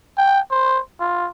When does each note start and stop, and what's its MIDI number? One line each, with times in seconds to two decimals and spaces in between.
0.17 0.40 79
0.50 0.80 72
1.00 1.28 65